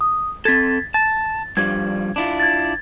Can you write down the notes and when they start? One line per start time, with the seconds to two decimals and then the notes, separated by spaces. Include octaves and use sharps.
0.01 D#6
0.45 C4 A4 G#6 A6 B6
0.94 A5 A6
1.57 G2 F3 G3 G#6
2.16 D4 E4 F4
2.40 G#6 A6